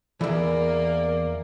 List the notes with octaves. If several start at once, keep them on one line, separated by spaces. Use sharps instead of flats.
E2 E3 A#3 A#4 D5